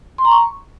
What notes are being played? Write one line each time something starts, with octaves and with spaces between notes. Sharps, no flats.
C6
A#5
C#6